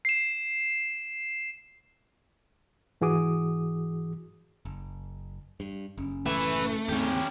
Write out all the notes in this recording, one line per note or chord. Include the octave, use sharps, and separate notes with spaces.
C7 E7
G#2 E3 F#4 G#4 D6 D#6
F#1
G2
F#1 C#4
F#1 A2 A3 B4 E5
D#2 G#2 C#3 C4 C#4 G4